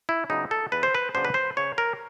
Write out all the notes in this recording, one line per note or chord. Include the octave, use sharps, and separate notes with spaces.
E4
C#3 F#3 B3 D4 D#4
A4
E2 B4
C5
B4
C#3 F#3 B3 D4 C5
B4
C5
C#3 C#5
A#4